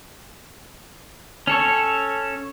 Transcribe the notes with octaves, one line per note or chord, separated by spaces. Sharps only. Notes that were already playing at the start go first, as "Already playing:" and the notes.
C#4 A4 C#5